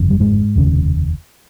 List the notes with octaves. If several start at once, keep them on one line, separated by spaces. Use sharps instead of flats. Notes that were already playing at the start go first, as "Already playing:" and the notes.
Already playing: G1 F2 C#3
G3
G#2 G#3
F1 D#2 C#3